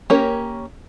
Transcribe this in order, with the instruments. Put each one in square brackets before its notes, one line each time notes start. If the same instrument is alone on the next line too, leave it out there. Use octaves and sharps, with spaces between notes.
[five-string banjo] A#3 C#4 G4 A#4 C#5